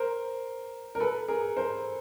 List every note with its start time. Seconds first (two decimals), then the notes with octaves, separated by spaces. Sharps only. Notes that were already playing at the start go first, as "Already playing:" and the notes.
Already playing: A#4 C5
0.95 A#4
1.00 A4 B4
1.28 G#4 A#4
1.56 A#4 C5